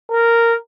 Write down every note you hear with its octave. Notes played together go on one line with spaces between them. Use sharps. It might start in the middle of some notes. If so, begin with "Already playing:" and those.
A#4